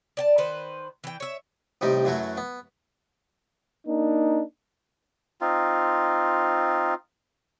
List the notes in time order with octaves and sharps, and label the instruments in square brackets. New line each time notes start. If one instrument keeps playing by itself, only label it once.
[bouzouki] D5 G5 A5
D#3 B4 C5
E3 G5
C#5 E5
[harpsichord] A1 C3 G3 D#4 G4
F#2 E3 F#3 A3 F#4
B3
[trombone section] A#3 D4 D#4
[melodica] C4 D#4 F4